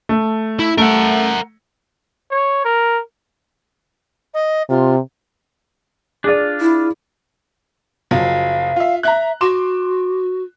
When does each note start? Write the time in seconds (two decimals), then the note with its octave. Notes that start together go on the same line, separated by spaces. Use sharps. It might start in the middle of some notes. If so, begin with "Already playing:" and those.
0.09 A3
0.59 E4
0.78 A3 A#4 F#5
2.31 C#5
2.65 A#4
4.34 D#5
4.69 C3 F4
6.24 D4 F4 G#4 D5
6.61 E4
8.11 F#1 F3 F#3 F5
8.76 F4 E5
9.03 E5 A#5 F#6
9.41 F#4 C6 D6 E7